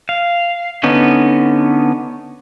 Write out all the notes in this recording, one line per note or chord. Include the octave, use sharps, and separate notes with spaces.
F5
D3 B3 C#4 D#4